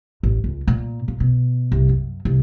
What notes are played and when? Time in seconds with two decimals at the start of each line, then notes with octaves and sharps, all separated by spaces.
0.23 A1
0.44 C#2
0.68 A#2
1.08 A#2
1.20 B2
1.72 C2
1.89 F#2
2.25 C2